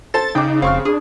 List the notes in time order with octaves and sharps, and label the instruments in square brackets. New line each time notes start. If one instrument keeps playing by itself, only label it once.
[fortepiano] A4 C5 A5 [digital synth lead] A6
[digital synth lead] C#3 [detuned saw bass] D#4 [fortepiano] G5 D6
[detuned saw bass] F1 [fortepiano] C4 C#6 F6 [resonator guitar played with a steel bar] F5
[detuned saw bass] D4 [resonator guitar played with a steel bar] G#4